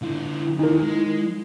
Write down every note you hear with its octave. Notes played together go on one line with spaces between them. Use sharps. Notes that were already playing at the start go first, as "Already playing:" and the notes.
D3 E4 F4
D#2 D#4 A#4
G#3